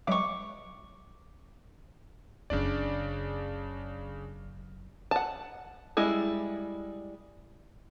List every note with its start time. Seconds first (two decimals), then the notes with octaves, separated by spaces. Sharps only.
0.07 F#3 G#3 E5 C#6 D6
2.50 F#1 F#2 C#3 D4 D5
5.11 F#5 A5
5.97 G3 G#3 E4